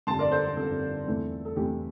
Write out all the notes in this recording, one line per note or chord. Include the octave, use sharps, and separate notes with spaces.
G1 F2 D3 G3 A5 C6
A#4 D5
A4 C5
A4
G1 F2 D3 G3 A4
E2 E3 A3 C4
A4
E2 E3 A3 C4 G4